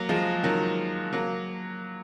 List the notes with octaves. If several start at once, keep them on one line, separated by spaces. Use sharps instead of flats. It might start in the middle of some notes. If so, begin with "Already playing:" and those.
Already playing: F#3 A#3
F3 G#3
D#3 F#3
F#3 A#3